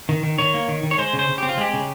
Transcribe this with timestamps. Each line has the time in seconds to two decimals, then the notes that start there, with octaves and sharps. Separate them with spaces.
0.09 D#3
0.23 D#3
0.38 D#3 C#5
0.54 A#3
0.68 D#3
0.83 D#3
0.91 C#5
0.98 G#3 C5
1.13 C#3
1.19 C5
1.29 C#3
1.38 C4 G4
1.49 F4
1.58 G#3 G4
1.74 C#3